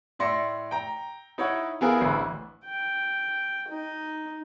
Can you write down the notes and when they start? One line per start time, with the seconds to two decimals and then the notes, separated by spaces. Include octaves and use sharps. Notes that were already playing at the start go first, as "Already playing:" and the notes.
0.19 A2 D5 E5 C6 A#6 C#7
0.71 G5 A#5
1.38 D#4 E4 C#5 D#5 E5 F#5
1.81 B3 E4 G#4 A#4 F5
2.01 D1 A1 D3 E4
2.65 G5
3.68 D#4